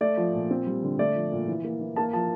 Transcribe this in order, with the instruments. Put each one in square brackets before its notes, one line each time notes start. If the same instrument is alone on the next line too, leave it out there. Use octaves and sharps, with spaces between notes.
[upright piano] A3 D5
F3
A#2
C4
G3
D3
A3 D5
F3
A#2
E3
A#3
E3
A#3 A5
F3 A5